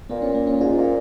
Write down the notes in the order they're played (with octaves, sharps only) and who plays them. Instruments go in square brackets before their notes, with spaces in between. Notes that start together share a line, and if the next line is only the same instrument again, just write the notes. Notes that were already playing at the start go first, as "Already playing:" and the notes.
[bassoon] A#2 [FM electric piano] B3
[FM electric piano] C#4
A#3
C#4
[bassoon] G#2 [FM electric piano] F4
[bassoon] A#2